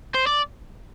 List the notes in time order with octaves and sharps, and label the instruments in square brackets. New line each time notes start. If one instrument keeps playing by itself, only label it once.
[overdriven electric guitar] C5
D5